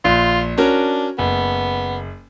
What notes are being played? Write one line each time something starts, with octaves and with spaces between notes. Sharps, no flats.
A#1 F4
C#4 D4 F#4 A#4
F#1 B3